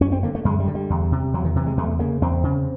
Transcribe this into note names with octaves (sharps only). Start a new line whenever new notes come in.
F#2 C#4
C4
D3 A#3
A3
F#2 G#3
G3
D3
G3
E2
C3
E2 F#3
D#3
C3 E3
G#3
E2 A3
C#3 A#3
E2 C4
C#3